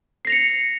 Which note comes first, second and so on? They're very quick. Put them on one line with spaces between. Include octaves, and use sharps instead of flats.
C7 A#6 F7 C#7